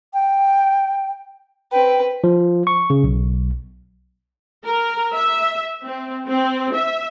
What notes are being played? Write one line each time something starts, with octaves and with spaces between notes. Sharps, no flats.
G5
C4 B4 G5
F3
C#6
C#3
B1
A#4
E5
C4
C4
E5